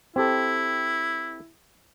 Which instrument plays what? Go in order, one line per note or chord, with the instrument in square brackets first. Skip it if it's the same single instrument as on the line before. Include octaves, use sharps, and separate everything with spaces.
[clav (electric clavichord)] C4 G4 A4 [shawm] E4